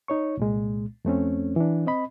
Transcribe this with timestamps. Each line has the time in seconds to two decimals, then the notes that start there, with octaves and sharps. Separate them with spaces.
0.08 D#4 C#5 C#6
0.37 C2 A#2 G#3
1.05 F2 A3 C4 C#4
1.56 E3 D4
1.87 C4 D#5 B5